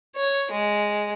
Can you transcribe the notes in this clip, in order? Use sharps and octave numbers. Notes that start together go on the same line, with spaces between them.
C#5
G#3